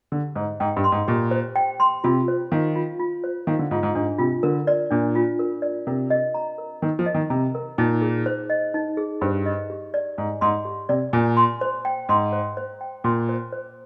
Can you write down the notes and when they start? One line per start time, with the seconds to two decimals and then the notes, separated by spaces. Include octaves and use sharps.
0.12 D3 G4
0.36 G#2 C5
0.60 G#2 G5
0.76 G2
0.84 C6
0.92 G#2
1.08 A#2 G4
1.31 C5
1.56 G5
1.80 C6
2.04 C3 F4
2.28 C5
2.52 D#3 F5
2.75 F4
2.99 F4
3.24 C5
3.47 D#3 F5
3.59 D3
3.71 G#2 F4
3.83 G#2
3.95 G#2 D4
4.18 C3 F4
4.43 D3 A#4
4.67 D5
4.91 A#2 D4
5.15 F4
5.39 A#4
5.62 D5
5.87 C3 A#4
6.10 D#5
6.34 A#5
6.58 A#4
6.82 D#3 A#4
6.99 F3
7.06 D#5
7.14 D#3
7.30 C3 A#5
7.55 A#4
7.78 A#2 D#4
8.02 G#4
8.26 C5
8.50 D#5
8.74 D#4
8.97 G#4
9.21 G2 C5
9.46 D#5
9.70 G4
9.94 D5
10.18 G#2 G#5
10.41 G#2 C6
10.65 G4
10.89 C3 D5
11.13 A#2 G#5
11.37 C6
11.61 C5
11.85 G5
12.09 G#2 C6
12.33 C5
12.57 C5
12.81 G5
13.04 A#2 C6
13.29 C5
13.53 C5